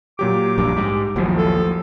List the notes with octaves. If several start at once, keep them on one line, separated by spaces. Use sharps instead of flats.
A#2 F#3 G4 D6
A#1 G2
G#2 G4
A1 D#2 F3 F#3
A4